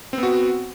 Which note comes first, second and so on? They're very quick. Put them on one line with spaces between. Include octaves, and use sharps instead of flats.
C4 B3 F#4